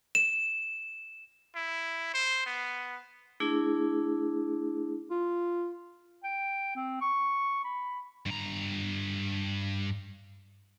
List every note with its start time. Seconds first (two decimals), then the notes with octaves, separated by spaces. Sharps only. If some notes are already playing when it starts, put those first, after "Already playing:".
0.15 E7
1.55 E4
2.14 C5
2.46 B3
3.40 A3 D4 E4 G#4
5.11 F4
6.24 G5
6.76 C4
7.01 C#6
7.64 B5
8.26 G2 A#5